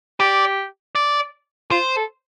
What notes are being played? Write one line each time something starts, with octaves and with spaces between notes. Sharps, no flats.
G4 D5
D5
F4 C5
A4